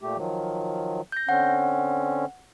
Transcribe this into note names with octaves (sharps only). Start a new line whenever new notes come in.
A#2 A3 G4
D#3 F3 F#3
G6 A#6
D3 C4 C#4 F#5